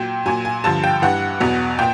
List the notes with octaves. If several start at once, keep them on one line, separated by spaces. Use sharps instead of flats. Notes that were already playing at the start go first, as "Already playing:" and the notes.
Already playing: A#2 F#3 G5
A#2 F#3 G#5
G#5
G2 D3 F3 A5
G5
G2 E3 F#5
E2 B2 F#3
A#2 G5